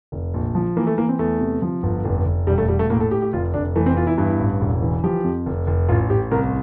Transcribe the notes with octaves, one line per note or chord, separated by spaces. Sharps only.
F1
A#1
F3
E3 A#3
A3
E3 A#3
C4
E2 A3
C3
F3
G1
F1
F1
E1 G3
A3
E1 G3
A3
A2 A#3
A4
A2 G4
G4
F1 F4
F1 D4
E3 A3
C4
E2 F4
E4
G2 E4
A1
E1
E3
F3 G4
F2
F1
F1
A1 F4
A1 G4
C2 A#4